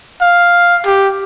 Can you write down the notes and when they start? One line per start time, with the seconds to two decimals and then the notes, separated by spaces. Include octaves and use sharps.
0.21 F5
0.86 G4